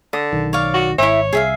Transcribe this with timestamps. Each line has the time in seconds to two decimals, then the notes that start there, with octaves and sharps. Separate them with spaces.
0.13 D3 D#6
0.32 B1 D#3
0.53 C#5 D5 F5
0.74 F#4
0.98 G#1 E4 C#5 E5
1.33 C2 G#4 E5 F5